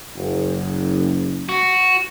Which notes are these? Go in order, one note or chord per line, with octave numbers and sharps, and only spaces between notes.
F#1
F#4